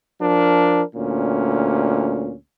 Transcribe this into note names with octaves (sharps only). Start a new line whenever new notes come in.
F3 D4 A#4
D2 A#2 C#4